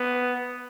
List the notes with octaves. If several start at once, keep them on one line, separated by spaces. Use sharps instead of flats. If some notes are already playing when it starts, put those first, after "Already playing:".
Already playing: B3